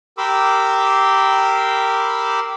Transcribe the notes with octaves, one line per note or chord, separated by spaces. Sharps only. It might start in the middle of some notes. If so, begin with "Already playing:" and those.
G4 A#4 B5 C6 D6 E6